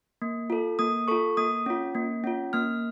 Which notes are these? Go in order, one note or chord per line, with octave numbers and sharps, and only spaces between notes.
A#3
F4 A4
A#3 D#6
F4 A4 C#6
A#3 D#6
C#4 F4
A#3
C#4 F4
A#3 F6